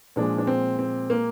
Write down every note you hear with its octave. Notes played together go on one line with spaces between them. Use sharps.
A#2 F3 G#3 D4
D4
C4
C4
A#3